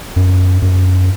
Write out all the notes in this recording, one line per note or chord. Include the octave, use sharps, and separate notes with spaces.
F#2
F#2